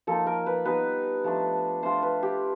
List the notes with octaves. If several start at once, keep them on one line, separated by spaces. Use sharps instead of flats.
F3 A#3 D#4 A4
A#4
B4
G3 B3 D#4 B4
F3 A3 D4
A3 D4 F4 C5
B4
G4